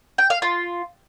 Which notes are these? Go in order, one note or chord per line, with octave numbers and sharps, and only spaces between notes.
G5
F5
F4